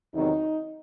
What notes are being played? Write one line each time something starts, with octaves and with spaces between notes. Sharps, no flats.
E2 C3 D#3 F#3 D#4